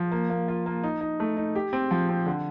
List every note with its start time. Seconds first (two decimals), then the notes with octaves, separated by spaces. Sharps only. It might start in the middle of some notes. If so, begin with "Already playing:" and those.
Already playing: F3
0.12 A#3
0.30 A#3
0.48 F4
0.66 A#3
0.84 D#4
1.01 D#4
1.20 A3
1.37 D#4
1.55 G4
1.73 C4
1.91 F3
2.09 C4
2.26 D3